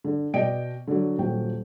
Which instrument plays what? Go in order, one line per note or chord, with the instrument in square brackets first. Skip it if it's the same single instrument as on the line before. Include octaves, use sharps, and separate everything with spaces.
[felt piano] D3
B2 D5 D#5 G5 D7
D3 F#3
D#1 F#3 G5